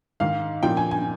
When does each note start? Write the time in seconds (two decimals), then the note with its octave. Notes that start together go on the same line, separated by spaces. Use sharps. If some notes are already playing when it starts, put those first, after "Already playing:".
0.20 G#2 D#3 F5
0.63 A#2 F3 G5
0.77 G#5
0.91 G#5